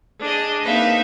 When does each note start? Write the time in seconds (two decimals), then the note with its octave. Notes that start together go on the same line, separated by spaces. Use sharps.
0.20 D4 G#4 D#5
0.63 A#3 C4 D#4 B4 E5 F5